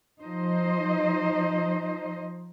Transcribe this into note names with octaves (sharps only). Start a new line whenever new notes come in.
F3 D#4 C5 D#5